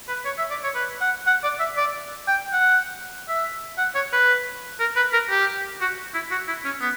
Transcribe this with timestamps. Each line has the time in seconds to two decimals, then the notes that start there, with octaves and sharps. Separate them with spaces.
0.08 B4
0.25 C#5
0.38 E5
0.50 D5
0.63 C#5
0.75 B4
1.01 F#5
1.26 F#5
1.43 D5
1.60 E5
1.77 D5
2.27 G5
2.53 F#5
3.28 E5
3.78 F#5
3.95 C#5
4.13 B4
4.80 A#4
4.96 B4
5.13 A#4
5.30 G4
5.81 F#4
6.14 E4
6.31 F#4
6.48 E4
6.65 C#4
6.81 B3